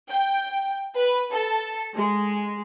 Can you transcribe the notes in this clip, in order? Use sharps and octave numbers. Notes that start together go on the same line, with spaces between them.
G5
B4
A4
G#3